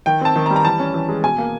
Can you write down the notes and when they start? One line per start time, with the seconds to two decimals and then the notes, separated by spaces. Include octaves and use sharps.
0.06 D#3 G5
0.21 C4 A5
0.36 D#3
0.46 A#5
0.50 G3
0.56 A#5
0.65 E3 A5
0.80 C#4
0.94 E3
1.09 G#3
1.23 B2 G#5
1.38 A#3